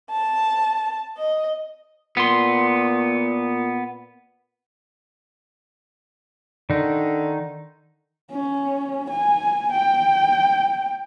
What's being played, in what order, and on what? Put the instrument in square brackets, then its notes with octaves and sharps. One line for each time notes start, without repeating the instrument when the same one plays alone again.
[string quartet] A5
D#5
[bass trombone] A#2 [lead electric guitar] B3 C6
[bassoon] D3 [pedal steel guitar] D#3 D#4
[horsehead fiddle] C#4
G#5
G5